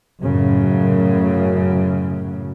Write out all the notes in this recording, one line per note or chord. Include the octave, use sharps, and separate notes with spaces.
F#2 A2 C#3 F#3